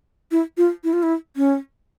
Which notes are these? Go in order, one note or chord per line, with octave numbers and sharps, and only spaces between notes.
E4
F4
E4
F4
E4
C#4